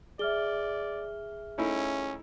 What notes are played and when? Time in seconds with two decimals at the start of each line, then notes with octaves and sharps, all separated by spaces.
0.19 G#4 D5 E5 F6 G7
1.58 A3 C#4 D#4 E4